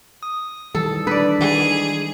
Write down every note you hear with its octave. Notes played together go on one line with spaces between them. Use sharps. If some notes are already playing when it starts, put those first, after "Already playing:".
D#6
D#3 E3 G3 A4
D4 B4 D5
D#3 G#3 G#4